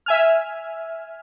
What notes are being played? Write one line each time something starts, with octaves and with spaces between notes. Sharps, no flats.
E5 G#5 F6